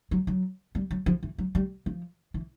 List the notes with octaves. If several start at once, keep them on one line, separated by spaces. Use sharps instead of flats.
F#3
F#3
G3
F#3
F3
E3
F#3
G3
F3
E3